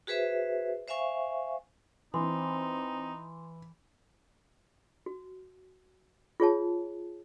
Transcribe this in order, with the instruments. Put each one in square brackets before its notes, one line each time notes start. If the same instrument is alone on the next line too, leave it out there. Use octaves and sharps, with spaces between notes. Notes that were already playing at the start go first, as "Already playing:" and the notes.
[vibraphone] F#4 G#4 B4 C5 E5
C5 E5 F5 G#5 C#6
[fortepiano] E3 [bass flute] C4 [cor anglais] D#4 [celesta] C6
[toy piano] F#4
F4 G#4 C#5 A5